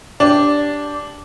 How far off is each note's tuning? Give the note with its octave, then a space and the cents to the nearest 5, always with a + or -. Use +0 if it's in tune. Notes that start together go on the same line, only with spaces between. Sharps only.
D4 -10 G4 +0